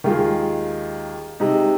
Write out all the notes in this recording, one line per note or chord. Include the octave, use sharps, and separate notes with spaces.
D#2 D#3 G#3 F4 G#4
C3 G#3 D#4